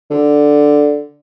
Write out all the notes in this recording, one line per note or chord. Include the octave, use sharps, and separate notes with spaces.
D3